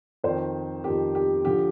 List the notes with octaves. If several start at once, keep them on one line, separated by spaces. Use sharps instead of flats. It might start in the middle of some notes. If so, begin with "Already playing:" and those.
F2 D#3 C5
F2 D#3 G4
G4
D3 F3 G4